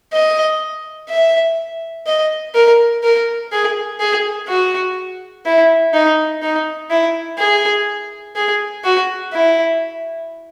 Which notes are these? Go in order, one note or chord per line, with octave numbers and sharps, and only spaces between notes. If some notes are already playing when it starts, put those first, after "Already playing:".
D#5
E5
D#5
A#4
A#4
G#4
G#4
F#4
E4
D#4
D#4
E4
G#4
G#4
F#4
E4